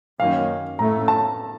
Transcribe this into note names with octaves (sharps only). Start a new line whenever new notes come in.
F#2 D#3 A#3 C#4 F5
A2 A3 C#4 A#5
A5